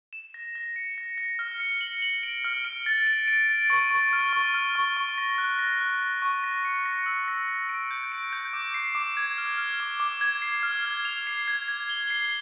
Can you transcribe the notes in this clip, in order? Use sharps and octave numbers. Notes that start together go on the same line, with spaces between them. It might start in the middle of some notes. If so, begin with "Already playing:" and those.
E7
A#6
A#6
C#7
A#6
A#6
F6
C#7
F#7
F#7
D7
F6
D7
A6
D7
D7
A6
C#6
C#6
F6
C#6
F6
C#6
C#6
A#6
F#6
A#6
F#6
A#6
C#6
A#6
C#7
A#6
E6
A#6
A#6
D7
G6
D7
G6
D6
C7
D6
G#6
F6
F6
D6
D6
G#6
C7
F6
G#6
F7
C7
G#6
G#6
G7
C7